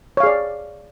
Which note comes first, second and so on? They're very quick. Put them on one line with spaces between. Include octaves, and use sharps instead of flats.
C#5 F5 G#4 D5